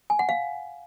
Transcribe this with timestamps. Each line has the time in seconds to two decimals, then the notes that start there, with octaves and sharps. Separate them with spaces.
0.10 G#5
0.19 F#5
0.29 F5